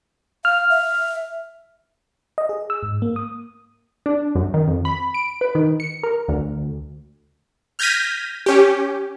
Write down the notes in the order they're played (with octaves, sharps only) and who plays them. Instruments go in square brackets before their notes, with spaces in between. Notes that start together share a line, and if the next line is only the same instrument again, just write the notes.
[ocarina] F5 [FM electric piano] F6
[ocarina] E5
[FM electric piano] D#5
G#4
E6
G#2
A#3
D#6
[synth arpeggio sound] D4
F#2
D#3
F2
B5
D7
B4
D#3
C#7
A#4
D2
[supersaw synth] F6 G6 G#6 A#6 B6 D#7
C#4 G4